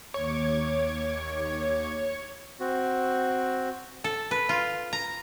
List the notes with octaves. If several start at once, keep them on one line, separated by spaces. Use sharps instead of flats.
D#2 C#5 D6 G#6
C4 F#4
A4
B4
F4
A#5